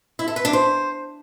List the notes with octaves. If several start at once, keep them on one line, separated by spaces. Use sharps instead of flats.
E4
A4
B4
D4
C5